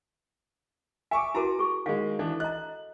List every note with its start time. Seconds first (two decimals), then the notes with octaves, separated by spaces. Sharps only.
1.11 E5 G#5 C#6 D6
1.35 E4 F#4 A#4 A#5 D6
1.59 G#4 C#6
1.86 D#3 G#3 F5
2.19 E3 D4 A4
2.40 D#5 A#5 F#6